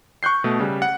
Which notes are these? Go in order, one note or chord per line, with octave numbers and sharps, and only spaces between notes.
C#6 F#6 G6 C7
B2 A3
C#3 G3
F#5